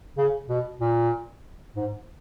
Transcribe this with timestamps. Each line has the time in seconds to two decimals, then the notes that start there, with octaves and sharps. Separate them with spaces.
0.18 C#3
0.49 B2
0.81 A#2
1.76 G#2